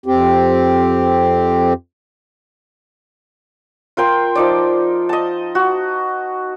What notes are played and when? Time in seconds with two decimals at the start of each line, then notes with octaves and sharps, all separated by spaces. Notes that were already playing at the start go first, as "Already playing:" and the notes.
0.06 F2 C4 G4
3.97 F4 A#4 G5 C6
4.35 F3 D#4 D5
5.09 D#5 A5
5.55 F#4